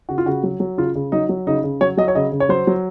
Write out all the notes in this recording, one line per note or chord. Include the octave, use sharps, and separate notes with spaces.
C#3 F#4
F4
C#3 F#4
F#3
F#3
C#3 F4
C#3
F#3 D#4
F#3
C#3 D#4
C#3
F#3 C#5
F#3 D#5
C#5
C#3 D#5
C#3
C#5
F#3 C5
F#3